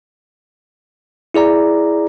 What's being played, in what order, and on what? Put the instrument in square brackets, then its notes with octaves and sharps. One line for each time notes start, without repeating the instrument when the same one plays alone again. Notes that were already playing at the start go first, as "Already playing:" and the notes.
[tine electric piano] E4 G#4 D5 A#5